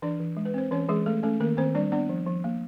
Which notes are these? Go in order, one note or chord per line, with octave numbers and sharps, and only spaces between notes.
E3 D4 D5
E3
G#3
B4
C4 C5
E3 C#4 C#5
E3 G#3 G#4
A3 A4
A3 C#4 A4
D#3 A#3 A#4
D#3 C4 C5
G3 D4 D5
B3 D4 D5
F3
F3
A#3